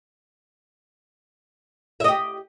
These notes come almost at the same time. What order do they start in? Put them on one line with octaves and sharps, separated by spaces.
E5 D#5 G4